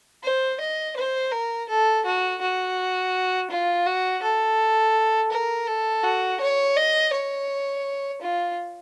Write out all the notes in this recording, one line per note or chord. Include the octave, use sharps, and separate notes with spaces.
C5
D#5
C5
A#4
A4
F#4
F#4
F4
F#4
A4
A#4
A4
F#4
C#5
D#5
C#5
F4